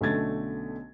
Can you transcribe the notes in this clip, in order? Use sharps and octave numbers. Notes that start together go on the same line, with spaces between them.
B1 D3 A3 C#4 G#6 A6